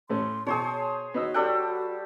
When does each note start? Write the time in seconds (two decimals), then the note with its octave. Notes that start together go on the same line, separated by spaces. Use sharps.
0.10 A2 A3 C#4 C6
0.47 B2 G#4 C5 C#5 A5
1.14 B3 D#4 F#4 E6
1.34 G3 A4 G5 D6 F#6